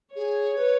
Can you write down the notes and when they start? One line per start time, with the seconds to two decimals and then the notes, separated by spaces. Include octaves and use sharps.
0.15 G#4 C#5
0.56 B4